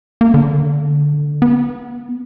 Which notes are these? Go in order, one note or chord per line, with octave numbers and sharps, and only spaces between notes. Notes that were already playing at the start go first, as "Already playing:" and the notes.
A#3
D3
B3